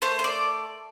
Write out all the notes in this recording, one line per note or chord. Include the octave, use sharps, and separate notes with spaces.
A3 C5
C5
D5